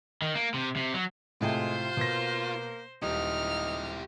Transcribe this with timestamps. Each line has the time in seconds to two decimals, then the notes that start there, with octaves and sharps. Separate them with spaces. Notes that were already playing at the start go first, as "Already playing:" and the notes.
0.22 D#3
0.36 A#3
0.54 C3
0.76 C3
0.94 F#3
1.41 A2 C3 G#3 A3 F4 C5
1.97 B2 A#3 A#6
3.02 D#1 D#4 E4 G4 F6